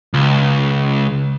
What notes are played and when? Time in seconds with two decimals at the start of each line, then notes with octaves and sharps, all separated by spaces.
0.14 C#2